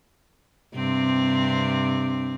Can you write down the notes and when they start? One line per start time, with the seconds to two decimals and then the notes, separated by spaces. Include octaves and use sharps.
0.75 G2 C3 C4